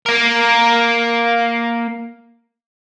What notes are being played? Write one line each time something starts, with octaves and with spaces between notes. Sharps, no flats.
A#3 A#4